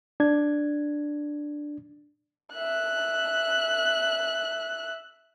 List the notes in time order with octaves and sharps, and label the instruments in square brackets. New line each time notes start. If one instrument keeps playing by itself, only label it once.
[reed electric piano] D4 G#6
[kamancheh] E5 F#6